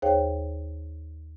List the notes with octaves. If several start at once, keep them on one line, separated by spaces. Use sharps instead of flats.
D#2 G#4 C5 C#5 F5 G5